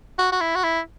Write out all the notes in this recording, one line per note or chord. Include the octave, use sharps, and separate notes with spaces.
F#4
F#4
E4
F#4
E4